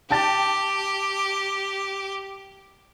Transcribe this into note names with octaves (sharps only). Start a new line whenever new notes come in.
G4 G5 A5 A6